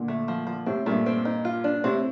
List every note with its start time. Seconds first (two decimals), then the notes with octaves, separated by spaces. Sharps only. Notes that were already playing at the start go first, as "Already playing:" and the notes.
Already playing: A#2 D3
0.08 A3
0.28 F3
0.47 F3
0.66 A2 C3 C4
0.86 G2 A#2 A3
1.06 C4
1.25 D#4
1.45 F4
1.64 D4
1.84 A2 C3 C4